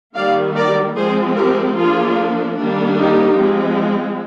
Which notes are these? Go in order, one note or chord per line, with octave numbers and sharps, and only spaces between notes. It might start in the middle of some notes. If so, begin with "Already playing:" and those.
D#3 G3 A#3 D5 F5
A#4 D5
F3 G#3 C4 G#4 C5
G4 A#4
F3 A#3 D4 F4 G#4
D#3 G3 A#3 D4
D#4 G4
F3 G#3 C4